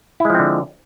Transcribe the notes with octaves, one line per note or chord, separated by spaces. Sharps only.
D3 F3 G#3 C4 E4